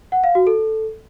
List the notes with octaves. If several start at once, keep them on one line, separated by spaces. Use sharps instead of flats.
F#5
F5
F#4
A4